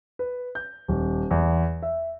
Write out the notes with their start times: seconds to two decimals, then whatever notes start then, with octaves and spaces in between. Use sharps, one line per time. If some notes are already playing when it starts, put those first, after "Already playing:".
0.19 B4
0.55 G6
0.88 D#1
1.31 E2
1.82 E5